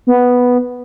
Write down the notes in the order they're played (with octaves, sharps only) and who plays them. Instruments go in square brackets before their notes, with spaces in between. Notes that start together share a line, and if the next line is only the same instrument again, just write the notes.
[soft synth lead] B3